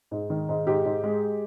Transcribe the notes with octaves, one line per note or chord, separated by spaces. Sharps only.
G#2
D#3
G#2
G#2 G4
G#2
G#3